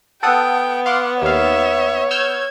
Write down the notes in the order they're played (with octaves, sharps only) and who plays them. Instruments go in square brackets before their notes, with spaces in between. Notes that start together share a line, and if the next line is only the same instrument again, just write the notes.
[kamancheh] B3 [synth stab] A4 F#5 D#6 [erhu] G5
[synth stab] F5 C6 D6 [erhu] F#5
[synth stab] D#2 F5 [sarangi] C#5 [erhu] E5
[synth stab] E6 F6 G6 [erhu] G#6